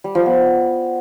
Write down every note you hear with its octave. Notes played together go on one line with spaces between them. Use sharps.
G3
F3
B3